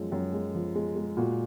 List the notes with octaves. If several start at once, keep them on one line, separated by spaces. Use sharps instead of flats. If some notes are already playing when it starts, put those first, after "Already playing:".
Already playing: F#2 F3 G#3
F#2
G#3
F3
G#3
G#3
A#2 F#4